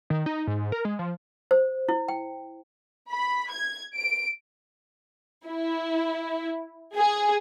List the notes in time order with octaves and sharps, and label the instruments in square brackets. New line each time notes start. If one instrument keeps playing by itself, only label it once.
[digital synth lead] D#3
D#4
G#2
A#4
G#3
F3
[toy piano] C5
E4
G5
[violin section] B5
G#6
D7
E4
G#4